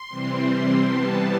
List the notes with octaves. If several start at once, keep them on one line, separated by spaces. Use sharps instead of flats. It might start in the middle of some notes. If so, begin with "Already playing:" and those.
Already playing: C6
C3 E3 G3 C4
C3 E3 G3 B3 A5